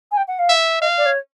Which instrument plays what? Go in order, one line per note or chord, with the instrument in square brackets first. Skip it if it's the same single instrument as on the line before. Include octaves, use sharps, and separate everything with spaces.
[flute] G#5
G5
F#5
F5
[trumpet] E5
[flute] D#5 [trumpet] F5
[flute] D5
C#5